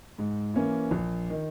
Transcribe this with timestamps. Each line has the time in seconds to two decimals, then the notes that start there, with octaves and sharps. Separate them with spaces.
0.18 G#2
0.54 E3 A#3 C#4 E4
0.91 A#1
1.30 D#3